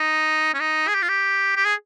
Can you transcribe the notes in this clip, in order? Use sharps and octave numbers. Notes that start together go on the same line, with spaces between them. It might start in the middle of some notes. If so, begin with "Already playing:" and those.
Already playing: D#4
C#4
D#4
G#4
G4
F4
G4
G4
G#4